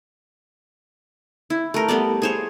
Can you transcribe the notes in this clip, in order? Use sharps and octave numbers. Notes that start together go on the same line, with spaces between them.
E4
A3 A#4
G3 A3 B3 D5
G#4 C5 C#5